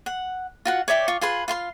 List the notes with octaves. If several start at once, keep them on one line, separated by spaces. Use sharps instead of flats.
F#5
F4 F#4 F#5
C#5 D5 E5 G5
F4 C#6
F4 G#4 B4 C6
F4 F5 C6